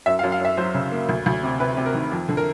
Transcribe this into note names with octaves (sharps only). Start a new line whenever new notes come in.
F#2 E5
F5
F#2
F5
F#2 E5
F#3 C5
C#3
A#3
D2
D2
C3
C3 B4
C3
A#4
D#3
F2
D3
A#4